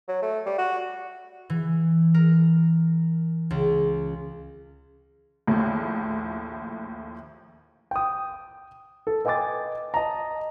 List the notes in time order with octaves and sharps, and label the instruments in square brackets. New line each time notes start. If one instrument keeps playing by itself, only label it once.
[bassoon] F#3
A3
G3
F#4
[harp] E3
A#4
C#2
[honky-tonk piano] A#1 D#2 A2
[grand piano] G5 D#6
A4
B4 D#5 G5 G#5 D6 A6
D#5 A5 A#5